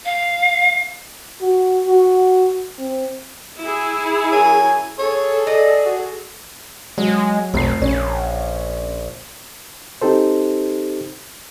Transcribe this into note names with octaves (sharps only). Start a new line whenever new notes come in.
F5
F#4
F#4
C4
E4 G#4
F#2 A#4 C#5 G#5
G#4 A4 C#5
D5 D#5
F#4
F#3 G#3
F1 B1 C7
A#1 C#4
C4 D#4 G4 A4 C5